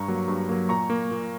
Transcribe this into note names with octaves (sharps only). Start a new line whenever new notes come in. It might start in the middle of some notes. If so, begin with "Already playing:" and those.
Already playing: G2 A#5 C#6
F#3 A#3
G2
F#3 A#3
A#2 A#5 C#6
A#3
A#2